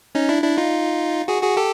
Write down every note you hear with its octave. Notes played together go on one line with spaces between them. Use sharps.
C#4 D#4
D4 E4
D4 E4
D#4 F4
F#4 G#4
F#4 G#4
G4 A4